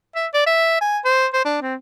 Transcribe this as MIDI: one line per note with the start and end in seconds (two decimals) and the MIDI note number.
0.15 0.27 76
0.34 0.46 74
0.46 0.78 76
0.81 0.99 80
1.04 1.27 72
1.33 1.43 72
1.45 1.59 62
1.62 1.75 60